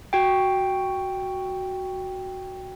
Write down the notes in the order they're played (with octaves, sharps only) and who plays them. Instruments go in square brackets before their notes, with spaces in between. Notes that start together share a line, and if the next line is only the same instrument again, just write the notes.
[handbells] F#4 G5